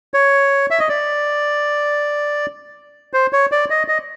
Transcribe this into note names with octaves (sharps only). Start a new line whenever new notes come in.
C#5
E5
D#5
D5
C5
C#5
D5
D#5
D#5